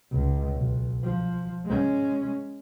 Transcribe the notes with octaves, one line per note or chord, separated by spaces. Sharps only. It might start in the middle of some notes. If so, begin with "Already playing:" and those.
C#2
B1
F3
G#3 C#4